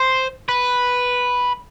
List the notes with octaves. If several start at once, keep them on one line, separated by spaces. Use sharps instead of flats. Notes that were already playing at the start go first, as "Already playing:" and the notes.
Already playing: C5
B4